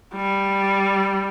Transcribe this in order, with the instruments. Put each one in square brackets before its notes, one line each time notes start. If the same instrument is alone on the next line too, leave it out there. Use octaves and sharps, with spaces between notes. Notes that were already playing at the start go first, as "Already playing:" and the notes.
[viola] G3